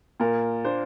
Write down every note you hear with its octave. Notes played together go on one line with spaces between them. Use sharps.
A#2 A#4
A#3 D4 C5